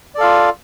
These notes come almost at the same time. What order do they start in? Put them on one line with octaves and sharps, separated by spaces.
D5 A4 F5 F4